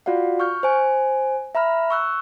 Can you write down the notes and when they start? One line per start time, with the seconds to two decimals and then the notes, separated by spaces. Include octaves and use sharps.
0.06 F4 F#4 D5 F5 F#5
0.40 C#6 F6 G6
0.63 C5 G#5
1.55 E5 A#5 B5 F6
1.90 C#6 E6 F#6